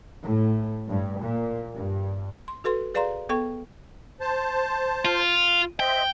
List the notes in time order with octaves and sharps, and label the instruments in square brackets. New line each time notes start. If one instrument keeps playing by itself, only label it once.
[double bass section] A2
G2
A#2
G2
[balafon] C6
F#4 A4 B4 C6
G#4 B4 D5 F5 A#5 C6
B3 A4 G5 C#6
[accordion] C5 A5
[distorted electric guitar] F4
[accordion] C5 D#5 E5 [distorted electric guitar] G5